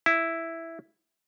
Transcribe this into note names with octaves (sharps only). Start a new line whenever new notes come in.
E4